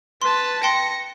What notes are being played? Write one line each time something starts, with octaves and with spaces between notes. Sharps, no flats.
B4 A5 C6
G5 A5 C6 A#6 C#7